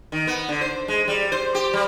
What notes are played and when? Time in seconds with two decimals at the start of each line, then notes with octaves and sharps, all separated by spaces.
0.12 D#3
0.27 B3
0.49 D3
0.61 C5
0.88 G#3
1.08 G3
1.32 C5
1.55 G4
1.73 G3